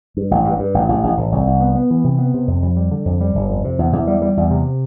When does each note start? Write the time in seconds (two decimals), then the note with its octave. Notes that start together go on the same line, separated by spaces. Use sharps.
0.17 G2
0.31 A1
0.45 G2
0.59 G2
0.74 A1
0.88 A1
1.03 A1
1.17 A1
1.32 C2
1.47 C2
1.60 B3
1.75 B3
1.91 E3
2.04 C3
2.19 B3
2.34 C3
2.47 F2
2.62 F2
2.76 G3
2.91 D3
3.05 F2
3.20 G3
3.35 G1
3.50 F2
3.65 C3
3.79 E2
3.93 E2
4.07 G3
4.22 G3
4.37 E2
4.50 C3